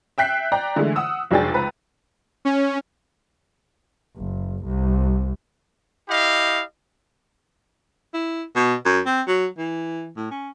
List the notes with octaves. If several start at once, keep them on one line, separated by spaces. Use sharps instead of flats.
E5 G5 F#6 B6 C7
D5 G5 A#5
D3 E3 G#3 A3
F#5 D#6 E6
F1 F#3 D4 G#4 G5 A6
C#2 B4 A#5
C#4
F#1
C2
E4 G4 D#5 F5
E4
B2
F#2
C4
F#3
E3
A2
C#4